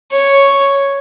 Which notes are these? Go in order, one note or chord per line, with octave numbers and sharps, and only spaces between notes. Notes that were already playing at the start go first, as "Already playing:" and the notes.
C#5